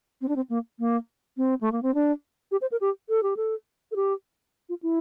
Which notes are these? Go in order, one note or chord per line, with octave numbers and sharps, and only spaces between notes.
C4
D4
C4
A#3
A#3
C4
A3
A#3
C4
D4
G4
C5
A#4
G4
A4
G4
A4
A4
G4
F4
E4